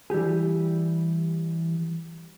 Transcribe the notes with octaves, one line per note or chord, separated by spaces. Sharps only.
E3 G3 G4 G#4